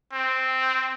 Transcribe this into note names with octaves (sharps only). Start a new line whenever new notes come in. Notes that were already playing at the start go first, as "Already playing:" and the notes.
C4